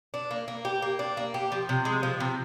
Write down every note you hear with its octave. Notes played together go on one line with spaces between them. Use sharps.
D4
A#3
A#3
G4
A#3
D4
A#3
G4
F3
C3
G#3
F3
C3